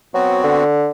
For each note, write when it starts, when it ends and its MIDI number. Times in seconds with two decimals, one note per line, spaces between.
0.14 0.39 54
0.14 0.64 59
0.14 0.64 60
0.14 0.64 66
0.44 0.91 50